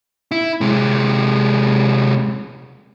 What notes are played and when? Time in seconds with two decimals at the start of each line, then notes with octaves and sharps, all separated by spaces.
0.32 E4
0.61 C3 G#3